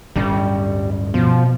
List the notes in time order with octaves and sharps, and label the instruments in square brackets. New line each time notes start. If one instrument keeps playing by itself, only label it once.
[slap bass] D1 G2 C#4 [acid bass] G3
[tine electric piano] B2 [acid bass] F3